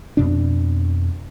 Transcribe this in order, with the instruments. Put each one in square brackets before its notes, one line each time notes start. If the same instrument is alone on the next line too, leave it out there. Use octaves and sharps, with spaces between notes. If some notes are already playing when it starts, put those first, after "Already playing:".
[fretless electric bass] F2 B2 D4